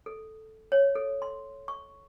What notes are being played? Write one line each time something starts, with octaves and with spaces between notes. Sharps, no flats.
A4
C#5
A4
C6
C#6